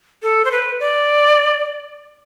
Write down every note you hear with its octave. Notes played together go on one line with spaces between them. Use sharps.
A4
C5
B4
D5